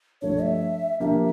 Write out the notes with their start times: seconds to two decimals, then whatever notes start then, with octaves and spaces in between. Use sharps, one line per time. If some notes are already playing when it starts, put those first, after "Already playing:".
0.22 G2 F3 A3 D4 C#5
0.42 E5
1.00 D3 F3 A#3 D4 G4 E5